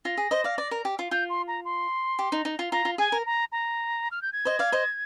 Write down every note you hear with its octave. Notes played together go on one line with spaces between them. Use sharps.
F4 A#6
G#4
C5 D#5
D5 F5
D5
A#4
G4
F4
F4 G6
C6
A#5
C6
G4
D#4
D#4
F4
F4 A#5
F4
G#4 G#5
A#4
A#5
A#5
F6
G6
G#6
C5 D#5
D5 F5
C5 D#5